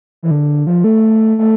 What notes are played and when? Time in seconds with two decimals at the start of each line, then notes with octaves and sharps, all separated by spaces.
0.23 E3
0.31 D3
0.67 F3
0.84 A3
1.39 A3